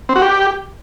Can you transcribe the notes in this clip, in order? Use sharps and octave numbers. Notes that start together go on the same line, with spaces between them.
C4
F#4
G4